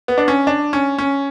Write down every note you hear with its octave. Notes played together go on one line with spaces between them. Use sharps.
B3
D4
C#4
D4
C#4
C#4